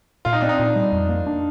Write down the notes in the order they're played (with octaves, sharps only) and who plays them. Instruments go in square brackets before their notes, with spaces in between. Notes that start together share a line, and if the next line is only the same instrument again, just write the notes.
[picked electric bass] A#2 [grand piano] F4
[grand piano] D#4
[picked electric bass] C4 [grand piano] D4
[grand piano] D#4
[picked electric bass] A#2
G3
F2
A#3
D4